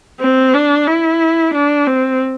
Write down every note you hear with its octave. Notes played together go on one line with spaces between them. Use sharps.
C4
D4
E4
D4
C4